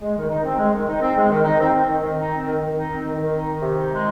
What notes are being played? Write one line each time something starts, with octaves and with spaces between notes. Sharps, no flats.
G#3
D#3
D#4
C4
G#3
D#3
D#4
C4
G#3
D#3
D#4
C4
C4
D#3
D#3
D#4
C4
D#3
D#3
D#4
C4
D#3
D#3
D#4
D#3
C3
D#4
G#3